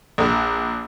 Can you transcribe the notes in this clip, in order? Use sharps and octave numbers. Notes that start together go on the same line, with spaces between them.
A#1